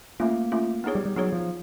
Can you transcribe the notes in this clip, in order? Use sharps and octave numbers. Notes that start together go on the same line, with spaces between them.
A3 A#3 C#4 F4
A3 C#4 F4
B3 D#4 G#4 C#5
G3
G3
F#3 B3 D#4 G#4 C#5
F3